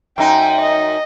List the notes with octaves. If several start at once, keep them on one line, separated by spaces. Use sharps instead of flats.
F#2 D#4 G5
D#5